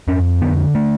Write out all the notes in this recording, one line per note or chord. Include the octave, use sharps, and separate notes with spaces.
F2 C#4
D3 B3
A3